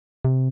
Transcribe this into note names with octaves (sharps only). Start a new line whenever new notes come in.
C3